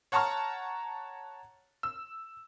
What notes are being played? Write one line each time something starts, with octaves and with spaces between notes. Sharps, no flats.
C#5 F#5 A5 A#5 C#6 F6
E6